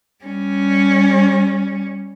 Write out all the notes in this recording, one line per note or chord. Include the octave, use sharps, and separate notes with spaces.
G3 C#4